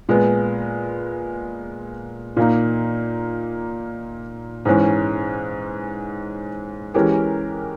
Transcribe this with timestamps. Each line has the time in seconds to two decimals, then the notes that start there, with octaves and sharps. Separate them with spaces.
0.09 A#2 G#3 B3
2.37 A#2 A#3 D#4
4.65 G#2 E3 G#3 C#4
6.94 E3 G#3 C#4 G4 A#4